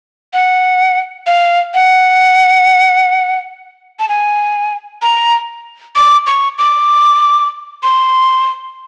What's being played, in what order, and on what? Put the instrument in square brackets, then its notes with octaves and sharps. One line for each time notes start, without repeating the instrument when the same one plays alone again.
[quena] F#5
F5
F#5
A5
G#5
A#5
D6
C#6
D6
C6